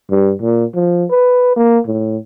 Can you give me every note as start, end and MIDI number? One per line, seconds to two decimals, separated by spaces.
0.10 0.33 43
0.42 0.65 46
0.75 1.04 53
1.10 1.53 71
1.56 1.78 58
1.87 2.17 45